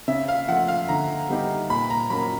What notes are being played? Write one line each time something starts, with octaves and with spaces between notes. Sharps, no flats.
C#3 E5
F5
F3 A3 F#5
F5
D3 A#5
G3 B3 D#4 G4
A#2 B5
A#5
F#3 A#3 C#4 B5